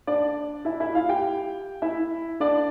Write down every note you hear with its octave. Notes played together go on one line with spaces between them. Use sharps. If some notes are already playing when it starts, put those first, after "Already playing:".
D4 D5
E4 E5
E4 E5
F4 F5
G4 G5
E4 E5
D4 D5